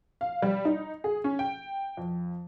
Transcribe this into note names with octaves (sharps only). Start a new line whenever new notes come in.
F5
G3
D#4
G#4
C#4
G5
F2